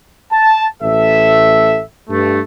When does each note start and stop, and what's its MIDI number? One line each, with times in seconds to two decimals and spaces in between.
0.32 0.64 81
0.82 1.81 33
0.82 1.81 69
0.82 1.81 76
2.10 2.40 43
2.10 2.40 57